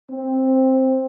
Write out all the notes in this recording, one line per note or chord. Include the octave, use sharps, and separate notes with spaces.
C4